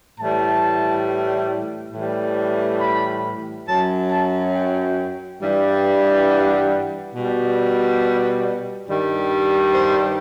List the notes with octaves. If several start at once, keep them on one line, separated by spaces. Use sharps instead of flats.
A2 E3 G3 A5
A2 E3 G3
B5
F#2 F#3 A5
A5
G5
G2 E3 G3
F#5
B2 G3
G2 D#3 G3
C5